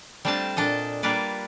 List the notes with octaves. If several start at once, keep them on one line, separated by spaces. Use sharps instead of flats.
G3 A3 C4 D4 F4 A5
A#2 D4 A4 D#5
G3 A#3 D4 F4 B4 D5